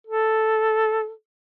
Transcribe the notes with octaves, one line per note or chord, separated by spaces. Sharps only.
A4